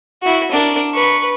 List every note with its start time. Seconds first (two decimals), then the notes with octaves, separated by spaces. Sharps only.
0.23 E4 F#4
0.51 D4 A#4
0.94 B4 C#6